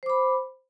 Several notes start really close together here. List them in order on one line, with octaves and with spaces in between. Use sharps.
C5 D6 B5